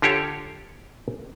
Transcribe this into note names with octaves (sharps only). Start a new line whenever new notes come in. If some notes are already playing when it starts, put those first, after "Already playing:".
D3 F4 G4 A4 C#5